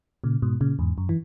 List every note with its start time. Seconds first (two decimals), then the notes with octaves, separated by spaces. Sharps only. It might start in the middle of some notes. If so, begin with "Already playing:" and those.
0.24 A#2 C#3
0.42 G#2 B2
0.61 A#2 C#3
0.79 E2 G#2
0.98 F#2
1.09 E3